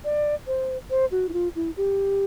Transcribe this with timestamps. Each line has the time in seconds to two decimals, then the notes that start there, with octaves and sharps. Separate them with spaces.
0.05 D5
0.47 C5
0.90 C5
1.11 F#4
1.29 E4
1.33 F4
1.56 E4
1.77 G4